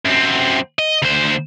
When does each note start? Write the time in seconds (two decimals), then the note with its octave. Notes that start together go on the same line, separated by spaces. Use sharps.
0.05 F#2 C4
0.79 D#5
1.02 D2 C5